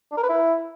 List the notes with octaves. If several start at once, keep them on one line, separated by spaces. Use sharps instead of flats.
D4
A#4
B4
E4